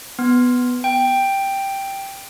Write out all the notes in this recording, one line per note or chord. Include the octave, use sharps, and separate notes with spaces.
B3
G5